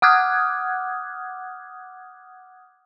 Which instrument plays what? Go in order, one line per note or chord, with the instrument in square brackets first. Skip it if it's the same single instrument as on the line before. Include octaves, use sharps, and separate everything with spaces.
[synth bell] F#5 D6 D#6 F6 F#6 G#6